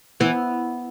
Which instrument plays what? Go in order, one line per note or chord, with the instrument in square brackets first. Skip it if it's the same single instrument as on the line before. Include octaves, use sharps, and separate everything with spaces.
[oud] E3 [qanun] B3